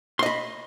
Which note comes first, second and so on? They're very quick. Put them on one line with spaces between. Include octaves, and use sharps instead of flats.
C6 D#5 B5